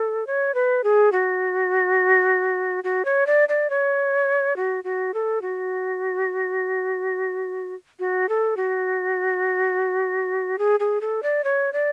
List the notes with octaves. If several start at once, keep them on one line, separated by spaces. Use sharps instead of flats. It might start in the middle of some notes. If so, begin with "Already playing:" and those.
Already playing: A4
C#5
B4
G#4
F#4
F#4
C#5
D5
D5
C#5
F#4
F#4
A4
F#4
F#4
A4
F#4
G#4
G#4
A4
D5
C#5
D5